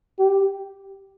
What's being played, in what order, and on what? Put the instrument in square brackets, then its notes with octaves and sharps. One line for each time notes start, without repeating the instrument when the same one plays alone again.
[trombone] G4